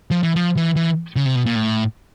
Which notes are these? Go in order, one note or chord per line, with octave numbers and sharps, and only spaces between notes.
F3
E3
F3
E3
E3
C#3
C3
B2
A#2
A2